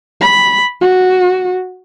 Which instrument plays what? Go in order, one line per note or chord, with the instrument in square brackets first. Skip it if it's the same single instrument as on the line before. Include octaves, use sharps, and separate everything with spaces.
[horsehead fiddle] B5
F#4